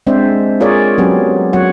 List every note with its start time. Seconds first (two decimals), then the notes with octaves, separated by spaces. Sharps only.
0.07 G#3 C4 D4 C5 D5 E5
0.60 F4 G#4 A#4 C#5 D5
0.98 F#3 B3 C#4 G4
1.53 F#3 F#4 C#5 F#5